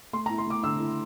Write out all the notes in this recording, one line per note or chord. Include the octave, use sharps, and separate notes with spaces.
A3 C6
A#5
E4
C6
A3 D6
D3 E6
E4